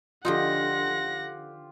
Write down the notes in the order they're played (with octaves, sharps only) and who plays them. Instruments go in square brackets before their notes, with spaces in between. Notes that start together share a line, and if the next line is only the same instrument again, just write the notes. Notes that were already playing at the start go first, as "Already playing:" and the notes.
[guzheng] D3 F3 D#4 [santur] F4 G4 [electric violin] F#5 A#6